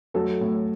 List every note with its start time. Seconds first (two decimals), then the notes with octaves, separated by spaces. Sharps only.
0.14 F#3 A3 A4
0.41 A2